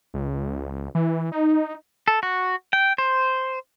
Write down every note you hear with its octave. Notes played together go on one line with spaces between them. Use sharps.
C#2
E3
D#4
A4
F#4
G5
C5